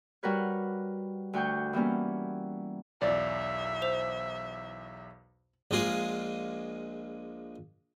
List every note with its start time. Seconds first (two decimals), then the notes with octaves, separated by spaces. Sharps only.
0.23 G3 F#4 A#4 B4 C#5
1.33 D2 F#4 G5 C#6 G6
1.73 E3 G3 A#3 B3 C#4
3.02 B1 E2 D5 E5
3.82 C5 F7
5.71 A#1 G#3 F4 G#4